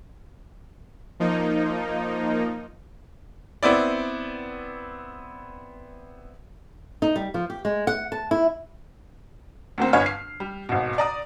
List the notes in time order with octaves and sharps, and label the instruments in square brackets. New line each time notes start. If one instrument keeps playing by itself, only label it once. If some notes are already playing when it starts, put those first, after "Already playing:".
[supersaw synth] F3 A#3 D#4
[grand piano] B3 C4 E4 D5
[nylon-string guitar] D#4
G3
F3
G4
G#3
F#5
A5
E4
[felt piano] D2 A#3 C4
G1 B3 C#5 G#5 F6
C7
G3
G#1 B2
D5 A#5 D#6